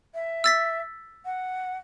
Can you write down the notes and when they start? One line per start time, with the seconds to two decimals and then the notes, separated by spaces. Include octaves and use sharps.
0.14 E5
0.44 E6 A6 B6
1.25 F#5